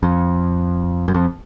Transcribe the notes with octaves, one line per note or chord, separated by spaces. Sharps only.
F2
F#2
F2